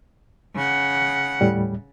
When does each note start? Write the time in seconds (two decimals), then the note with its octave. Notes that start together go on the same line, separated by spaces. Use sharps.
0.55 C#3 F#5
1.41 D#2 A2 G3